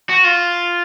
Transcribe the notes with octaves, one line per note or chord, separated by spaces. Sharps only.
F#4
F4